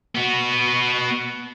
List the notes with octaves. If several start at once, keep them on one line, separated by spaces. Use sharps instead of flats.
B3 F#4